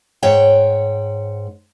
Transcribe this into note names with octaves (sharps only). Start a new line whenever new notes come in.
G#2 C#5 F#5 G5